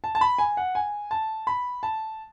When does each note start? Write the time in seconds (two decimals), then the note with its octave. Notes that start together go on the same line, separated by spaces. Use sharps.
0.04 A5
0.15 A5
0.21 B5
0.38 G#5
0.57 F#5
0.75 G#5
1.11 A5
1.47 B5
1.83 A5